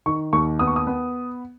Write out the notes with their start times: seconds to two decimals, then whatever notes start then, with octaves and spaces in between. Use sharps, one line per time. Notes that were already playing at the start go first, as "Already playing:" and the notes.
0.06 D#3 C#6
0.33 D#2 C#6
0.59 B3 D#6
0.67 C#6
0.76 D#6
0.87 B3